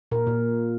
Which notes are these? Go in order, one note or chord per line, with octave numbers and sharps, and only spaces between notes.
A#2 A#4
A#2